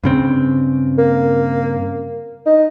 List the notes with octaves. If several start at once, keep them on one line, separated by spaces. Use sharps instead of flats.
G2 C#3 C4
A#3
D#4